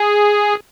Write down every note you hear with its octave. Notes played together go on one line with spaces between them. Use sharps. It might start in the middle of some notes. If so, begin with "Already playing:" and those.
Already playing: G#4